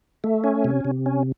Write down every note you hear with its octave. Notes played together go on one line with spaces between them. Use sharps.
A3
C#4
C3
C3
C#4